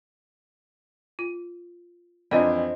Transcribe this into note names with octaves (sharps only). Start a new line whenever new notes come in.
F4
F2 E3 D4 F4 C5 D5 D#5 G#5